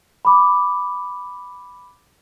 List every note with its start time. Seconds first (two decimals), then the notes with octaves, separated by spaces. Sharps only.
0.25 B5 D6